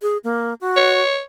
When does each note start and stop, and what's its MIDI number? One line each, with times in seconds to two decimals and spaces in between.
0.02 0.17 68
0.24 0.54 58
0.61 1.02 66
0.76 1.21 73